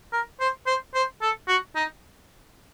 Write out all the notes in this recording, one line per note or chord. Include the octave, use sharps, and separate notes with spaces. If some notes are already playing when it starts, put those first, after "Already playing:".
A#4
C5
C5
C5
A4
F#4
D#4